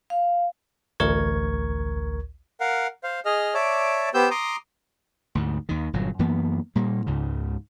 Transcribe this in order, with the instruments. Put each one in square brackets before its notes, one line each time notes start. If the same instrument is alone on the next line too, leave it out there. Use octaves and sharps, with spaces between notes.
[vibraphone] F5
[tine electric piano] A1 D2 A#4 C#6 G#6
[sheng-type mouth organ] A#4 F5 F#5
C5 F5
G#4 D#5 F6
C#5 D5 E5 A5 D6
B3 G4 C5 E6 G6
A#5 C6 D6 D#6
[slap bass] D2 G#2
D#2 D#3
G1 A#2 F#3
F#2 E3 A#3 B3
A#2 G3 A#3
C#2 G#2 C#3